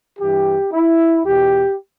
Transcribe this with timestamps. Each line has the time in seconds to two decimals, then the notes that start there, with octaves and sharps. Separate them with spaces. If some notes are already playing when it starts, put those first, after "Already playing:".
0.19 G2 E3 G4
0.72 E4
1.26 E2 B2 G4